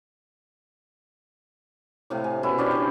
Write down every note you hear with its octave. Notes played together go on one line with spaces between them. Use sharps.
A2 C3 F5
G#5
B2 C#4 E4 G#5
C#4 D4 G4 C5
C#3 C5